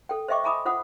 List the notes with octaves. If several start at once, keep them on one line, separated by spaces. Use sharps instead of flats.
A4 G5
C5 D#5 E5 G5 C#6 D6
E5 G#5 A#5 B5 D6 D#6
F4 C5 F#5 D#6